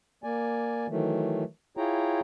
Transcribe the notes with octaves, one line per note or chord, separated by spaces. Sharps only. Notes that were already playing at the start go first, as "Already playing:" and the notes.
A#3 D5 G#5
D#3 E3 F#3 A3
E4 F4 G#4 C#5 G5 A#5